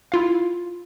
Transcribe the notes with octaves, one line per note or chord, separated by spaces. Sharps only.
E4 F4 F5